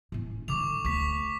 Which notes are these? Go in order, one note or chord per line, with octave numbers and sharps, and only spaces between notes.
A2 C#4
D3 F#3 C#6 D6 F7
D2 C#6 B6